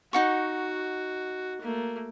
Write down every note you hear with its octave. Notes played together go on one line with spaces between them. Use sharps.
D#4 F#4 F#5 C#6
A3 A#3